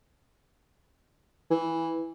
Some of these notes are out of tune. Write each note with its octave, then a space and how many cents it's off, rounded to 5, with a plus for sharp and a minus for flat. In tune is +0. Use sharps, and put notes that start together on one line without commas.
E3 -5